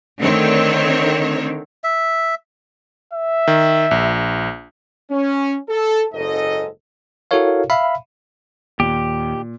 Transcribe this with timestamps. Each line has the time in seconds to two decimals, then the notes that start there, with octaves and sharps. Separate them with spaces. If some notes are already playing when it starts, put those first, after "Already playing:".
0.19 D3 D#3 A3 C4 C#5
1.84 E5
3.14 E5
3.47 D#3
3.91 A#1
5.11 C#4
5.69 A4
6.13 F#1 G#2 A4 D#5
7.31 E4 F#4 A4 A#4 C#5 F5
7.70 E5 F5 B5
8.80 D#2 A#2 G4